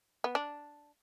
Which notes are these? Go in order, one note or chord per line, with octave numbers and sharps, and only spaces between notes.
B3
D4